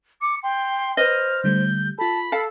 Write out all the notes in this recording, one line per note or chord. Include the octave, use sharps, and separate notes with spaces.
D6 C#7
G5 C6
B4 C5 D#5 F6
D3 G3 A3 G6
F4 A4 A5 B5
A4 F5 A5 C#7